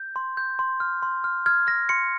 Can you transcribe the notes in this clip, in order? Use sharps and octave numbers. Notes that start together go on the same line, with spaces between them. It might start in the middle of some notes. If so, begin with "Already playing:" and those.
Already playing: G6
C6
G6
C6
F6
C6
F6
F6 G#6
F6 A#6
C6 C#7